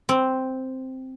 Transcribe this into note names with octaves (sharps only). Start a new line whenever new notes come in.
C4